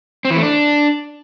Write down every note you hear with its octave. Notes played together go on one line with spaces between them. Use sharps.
C4
E3
A3
D4